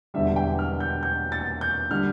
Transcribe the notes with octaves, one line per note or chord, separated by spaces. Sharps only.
E1 E2 D3 G3 E5
G5
F6
G6
G6
A6
G6
D3 G3 F6